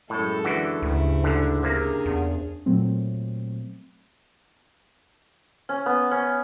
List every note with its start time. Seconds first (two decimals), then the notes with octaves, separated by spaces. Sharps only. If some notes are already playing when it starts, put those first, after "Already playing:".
0.10 F#2 A2 G#3 A4
0.45 D3 E3 F#4
0.82 D2 G2 C#3 E4
1.24 G#2 D3
1.63 C3 A#3 C#4 D4 G#4
2.06 E2
2.66 A#2 F#3 A3 C4
5.69 C#4
5.86 B3
6.11 C#4